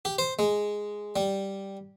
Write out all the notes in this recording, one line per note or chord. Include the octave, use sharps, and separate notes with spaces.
G4
C5
G#3
G3